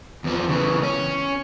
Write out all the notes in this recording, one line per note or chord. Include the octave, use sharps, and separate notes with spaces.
E2 F3
C#3 E3
C#4